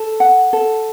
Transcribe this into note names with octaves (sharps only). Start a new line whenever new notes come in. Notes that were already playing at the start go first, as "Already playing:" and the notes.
Already playing: A4
F#5
A4